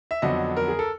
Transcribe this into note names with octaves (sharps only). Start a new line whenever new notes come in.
E5
F2 D3 F#3 B3 D4 D#5
A#4
G#4
A4